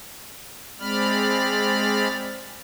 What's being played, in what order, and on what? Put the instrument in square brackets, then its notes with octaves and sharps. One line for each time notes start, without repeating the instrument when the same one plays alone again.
[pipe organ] G#3 C4 D5 B5 F6